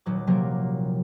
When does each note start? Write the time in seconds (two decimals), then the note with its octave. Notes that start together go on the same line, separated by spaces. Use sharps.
0.06 D#1 F#3 D6
0.27 C3 F3 F#3 A#3 A#4